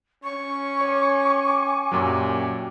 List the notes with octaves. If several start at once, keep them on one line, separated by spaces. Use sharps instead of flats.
C#4 C#6
C#5 G5 G#5 D6
F#2 A#2 F#3 G4